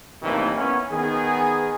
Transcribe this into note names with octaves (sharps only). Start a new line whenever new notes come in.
B1 A2 C3 D#3 E3 A#3
B3 C#4
D#3 B3 G#4